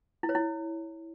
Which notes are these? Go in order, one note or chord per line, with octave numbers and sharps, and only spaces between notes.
E4
C#5
E4